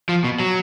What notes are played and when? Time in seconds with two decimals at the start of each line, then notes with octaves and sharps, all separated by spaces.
0.09 F3
0.24 B2
0.40 F#3